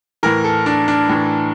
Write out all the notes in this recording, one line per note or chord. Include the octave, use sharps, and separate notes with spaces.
A2 E3 A#4
A4
D4
D4
A2 E3